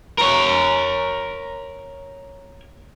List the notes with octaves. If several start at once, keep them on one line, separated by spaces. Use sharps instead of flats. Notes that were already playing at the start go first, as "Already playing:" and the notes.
A#4 C#5